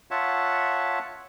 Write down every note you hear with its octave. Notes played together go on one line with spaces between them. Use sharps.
F4 C#5 E5 F#5 A5